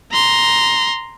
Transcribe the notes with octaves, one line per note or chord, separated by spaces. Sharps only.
A#5 C6